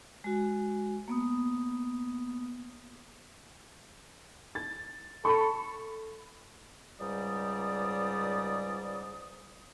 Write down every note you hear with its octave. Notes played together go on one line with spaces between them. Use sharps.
G#3 F#4
A#3 B3 D#6
A6
A4 B5 C#6
C#2 G#2 G3 D5 D#6